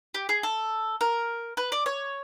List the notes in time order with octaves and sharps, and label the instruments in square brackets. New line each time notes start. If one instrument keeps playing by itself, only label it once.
[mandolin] G4
G#4
A4
A#4
B4
D5
C#5